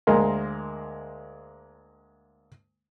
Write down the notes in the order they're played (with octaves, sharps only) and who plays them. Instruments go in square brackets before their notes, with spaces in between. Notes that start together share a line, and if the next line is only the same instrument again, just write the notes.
[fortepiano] D2 G#3 A#3 A#4 A#5 C6